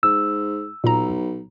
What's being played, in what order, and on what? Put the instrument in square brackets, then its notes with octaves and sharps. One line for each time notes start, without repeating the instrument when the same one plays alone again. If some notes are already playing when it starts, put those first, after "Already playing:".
[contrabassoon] G#2 [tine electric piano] E6
[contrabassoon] B1 [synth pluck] A#2 A#5